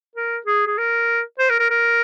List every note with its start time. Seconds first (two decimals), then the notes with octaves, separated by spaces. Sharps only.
0.16 A#4
0.46 G#4
0.66 G#4
0.78 A#4
1.39 C5
1.50 A#4
1.60 A#4
1.70 A#4